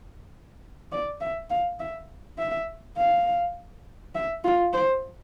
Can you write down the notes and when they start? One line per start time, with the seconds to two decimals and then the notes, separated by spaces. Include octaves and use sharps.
0.92 D5
1.21 E5
1.50 F5
1.80 E5
2.38 E5
2.98 F5
4.15 E5
4.44 F4
4.74 C5